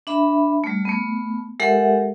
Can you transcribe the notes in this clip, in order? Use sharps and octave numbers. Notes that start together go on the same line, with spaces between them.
D4 E5 B5
G3 A3
A3 B3
G#3 G4 A4 A#4 E5 F#5